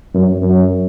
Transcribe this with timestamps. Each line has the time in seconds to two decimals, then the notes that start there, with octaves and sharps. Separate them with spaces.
0.14 F#2
0.42 F#2